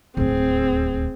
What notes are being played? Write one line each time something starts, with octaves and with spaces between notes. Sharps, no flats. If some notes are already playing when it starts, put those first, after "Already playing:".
D1 D#2 C4 G#4